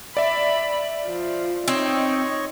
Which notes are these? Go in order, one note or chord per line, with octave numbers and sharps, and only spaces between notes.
D5 E5 B5
F3
C4 D#4 C#5 D#5 C#6